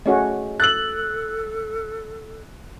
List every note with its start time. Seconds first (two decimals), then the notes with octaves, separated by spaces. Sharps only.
0.06 A3 C#4 F#4 G#4 D#5
0.60 A4 E6 F#6 A6 F#7